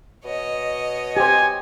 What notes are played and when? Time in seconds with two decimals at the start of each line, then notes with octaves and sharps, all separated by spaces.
0.25 B2 C#5 D#5
1.17 G4 C5 G#5